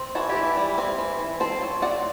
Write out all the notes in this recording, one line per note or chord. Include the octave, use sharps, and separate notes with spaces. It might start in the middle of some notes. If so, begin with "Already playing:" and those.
Already playing: C4
E3 F#4 A4
E4 G4
E3
E4
G3
C4
E3
E3
C4 A4 C5
F#3
C4 D5 F#5